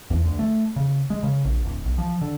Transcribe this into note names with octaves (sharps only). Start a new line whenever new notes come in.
E2
D2
A3
C#3
G#3
C#3
A#1
D1
B1
F3
D3